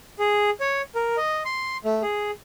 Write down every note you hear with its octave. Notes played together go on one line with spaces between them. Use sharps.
G#4
C#5
A#4
D#5
C6
A3
G#4